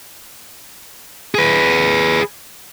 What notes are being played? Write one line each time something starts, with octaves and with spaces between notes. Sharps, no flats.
G#4 B4